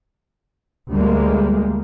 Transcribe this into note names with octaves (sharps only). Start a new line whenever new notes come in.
D2 G3 G#3 A#3